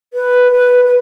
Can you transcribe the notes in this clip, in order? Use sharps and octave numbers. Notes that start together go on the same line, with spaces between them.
B4
B4
B4